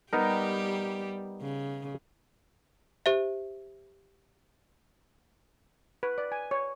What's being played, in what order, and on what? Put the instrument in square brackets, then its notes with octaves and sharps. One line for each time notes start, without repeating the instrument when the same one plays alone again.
[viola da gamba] G3 G4 [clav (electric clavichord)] B3 D#4 A#4
[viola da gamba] C#3
[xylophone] G4 C5 E5
[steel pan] B4
D5
G#5
C#5